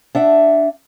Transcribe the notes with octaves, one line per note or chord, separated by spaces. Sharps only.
D4 E5 F#5